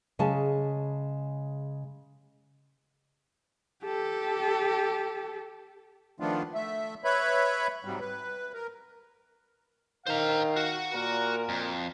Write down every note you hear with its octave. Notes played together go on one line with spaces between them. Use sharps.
C#3 G#3 A5
G4 A4
D#3 F3 A3 B3 D4 F4
A3 E5
B4 C#5 E5 B5
G#2 C3 F#3 G3
B4
A#4
D#3 C5 F5 A#5
F#4 F#5
A#2 A#4
F2